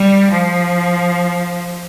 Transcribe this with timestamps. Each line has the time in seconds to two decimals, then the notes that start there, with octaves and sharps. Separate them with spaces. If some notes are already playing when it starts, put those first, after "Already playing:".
Already playing: G3
0.31 F3